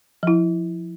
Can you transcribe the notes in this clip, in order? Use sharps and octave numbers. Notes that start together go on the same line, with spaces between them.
F3 E4